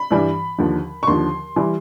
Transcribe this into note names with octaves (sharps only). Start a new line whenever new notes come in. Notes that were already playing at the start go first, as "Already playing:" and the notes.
Already playing: B5
G2 E3 G3
D#2 D3 F3
C#6
D#2 D3 F3 C6
E3 G3